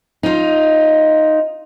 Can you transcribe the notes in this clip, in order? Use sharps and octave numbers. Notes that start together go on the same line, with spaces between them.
D#4 F4